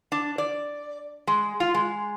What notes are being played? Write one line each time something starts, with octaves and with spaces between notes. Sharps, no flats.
D4
D5
G#3
F4
G#3